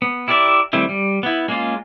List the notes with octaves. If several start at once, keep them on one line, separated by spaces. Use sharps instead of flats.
B3
E4 G4 A#4 D5 E5
D#3 G3 A3 C4 E4
G3
B3 E4
G#3 A#3 C#4 F4